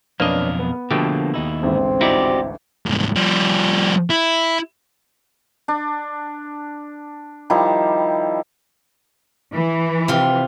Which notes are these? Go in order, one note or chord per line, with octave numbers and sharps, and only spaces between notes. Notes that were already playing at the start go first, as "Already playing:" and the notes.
B1 F2 A#3 C#4 D4 A#4 B4 D#5
B3
B2 D3 F3 A3 A#3 G4
D#2 D#4 E4
A1 D2 G#2 C4
D#4 E4 F#4 G4 D5
C2 G#2
F3 G3
E4
D4
D#3 F3 G3 E4
E3
C3 F4